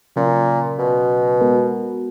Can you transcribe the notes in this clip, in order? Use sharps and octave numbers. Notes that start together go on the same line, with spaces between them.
A#2 C#3 F#3 C#4
B2
G#3 B3 F#4 A#4